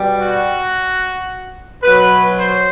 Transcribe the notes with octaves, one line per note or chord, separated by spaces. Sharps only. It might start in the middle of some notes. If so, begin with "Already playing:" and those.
Already playing: B2 G3
F#4
B2 F#3 B4
C5